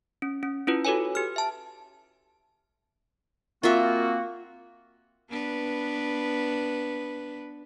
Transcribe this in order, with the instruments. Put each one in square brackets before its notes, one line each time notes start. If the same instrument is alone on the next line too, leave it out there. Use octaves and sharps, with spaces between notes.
[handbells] C#4
C#4
C#4 E4 F4 B4
F#4 A4 B4 C#5 G#5
G4 F6
E5 A5
[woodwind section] A#3 C4 F#4 [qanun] F4 E5
[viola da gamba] B3 D4 B4